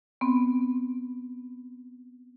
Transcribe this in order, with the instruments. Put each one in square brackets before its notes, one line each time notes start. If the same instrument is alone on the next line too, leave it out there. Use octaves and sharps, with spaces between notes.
[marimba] B3 C4